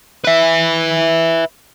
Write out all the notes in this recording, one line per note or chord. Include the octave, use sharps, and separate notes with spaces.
B4 E5